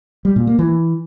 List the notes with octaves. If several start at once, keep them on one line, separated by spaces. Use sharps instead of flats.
G3
A#2
A#3
E3